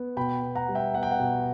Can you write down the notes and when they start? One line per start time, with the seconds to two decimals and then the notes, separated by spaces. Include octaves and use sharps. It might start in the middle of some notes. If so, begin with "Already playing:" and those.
Already playing: B3
0.17 B2 G5 B5
0.43 B2
0.55 F#5 A#5
0.68 G3
0.75 E5 G5
0.94 B3 F#5
1.03 G5
1.11 F#5
1.20 B2